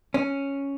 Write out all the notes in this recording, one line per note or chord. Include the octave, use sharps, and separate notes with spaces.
C#4